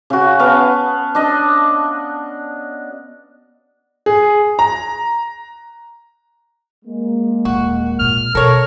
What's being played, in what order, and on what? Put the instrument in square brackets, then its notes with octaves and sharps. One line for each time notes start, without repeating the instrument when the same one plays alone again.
[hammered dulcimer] C#3 F#4
B3 F5 A5
D4 D#5
[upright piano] G#4
A#5
[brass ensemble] G#3 A#3
[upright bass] D#1 [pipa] F#4
[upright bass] A#2 C4 [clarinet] F6
[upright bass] B2 [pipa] A4 C#5 [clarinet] A#4